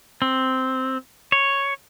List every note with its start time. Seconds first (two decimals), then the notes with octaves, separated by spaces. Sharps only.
0.22 C4
1.32 C#5